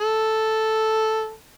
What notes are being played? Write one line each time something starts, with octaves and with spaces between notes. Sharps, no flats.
A4